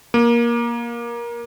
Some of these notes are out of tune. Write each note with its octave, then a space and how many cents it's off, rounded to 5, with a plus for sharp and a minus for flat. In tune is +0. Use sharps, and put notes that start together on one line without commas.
A#3 +20